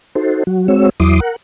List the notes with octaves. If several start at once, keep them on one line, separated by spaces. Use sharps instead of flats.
D#4 F#4 A4 C5
F#3 F#4
G#3 C4 F#4 C#5 E6
E2 F#3 E4 C6 D6 D#6
A#4 F#5